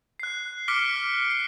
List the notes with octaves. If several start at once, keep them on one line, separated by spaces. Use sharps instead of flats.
F#6 C7
D6 F6 B6 C#7 D7 G7
C7